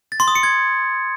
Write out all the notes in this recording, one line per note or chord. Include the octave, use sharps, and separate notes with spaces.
A6
C6
D#6
C#7
G#6